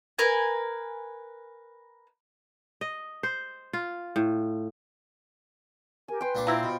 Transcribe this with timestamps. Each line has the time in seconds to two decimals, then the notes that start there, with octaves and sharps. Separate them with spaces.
0.19 A#4 B4 G#5
2.81 D#5
3.23 C5
3.73 F4
4.16 A2
6.08 G4 A#4 G#5
6.21 B4 G5 C6
6.35 A#2 D4 D6
6.47 C4 E4 F4 A#5
6.63 B2 C5 G5 B5